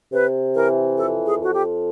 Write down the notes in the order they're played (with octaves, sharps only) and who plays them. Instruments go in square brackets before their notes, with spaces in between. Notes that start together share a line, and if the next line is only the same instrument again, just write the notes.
[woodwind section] C3 [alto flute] B4
[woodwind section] E3 [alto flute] A#4
[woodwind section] F2 [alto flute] A4
[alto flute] G#4
[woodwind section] F2 [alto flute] F#4
[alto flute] G4